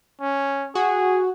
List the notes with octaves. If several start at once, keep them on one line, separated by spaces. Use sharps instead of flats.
C#4
F#4 G#4